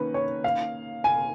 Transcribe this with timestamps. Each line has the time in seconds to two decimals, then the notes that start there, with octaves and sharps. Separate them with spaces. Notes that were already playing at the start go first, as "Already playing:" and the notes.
Already playing: D#3 A#3 C#4 B4
0.14 C#5
0.44 F5
1.04 G#5